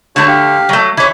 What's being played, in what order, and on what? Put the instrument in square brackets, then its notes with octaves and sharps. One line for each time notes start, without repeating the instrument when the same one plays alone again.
[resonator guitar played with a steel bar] D3 A3 [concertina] F#4 C#5 A5
[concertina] G4 F5
[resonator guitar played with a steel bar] F#3 A3
[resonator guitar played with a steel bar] E3 C#5 [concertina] B5